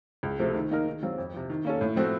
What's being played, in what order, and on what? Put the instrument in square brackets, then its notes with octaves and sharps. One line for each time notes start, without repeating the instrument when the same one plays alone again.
[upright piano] C#2
C3 F3 A3
D#3
A#3 D#4 A#4
D#3
F#3 C4 F4
F2
C3 F3
D#3
A#3 C#4 A4
A2
F3 A3 C4 F#4